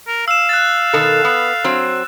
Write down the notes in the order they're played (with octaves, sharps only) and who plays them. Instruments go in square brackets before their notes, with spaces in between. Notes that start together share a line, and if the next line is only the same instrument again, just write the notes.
[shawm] A#4
[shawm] F5 [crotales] E6 E7
[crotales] F#6 A6
[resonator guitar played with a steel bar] B2 D#3 A4
B3
F#3 C4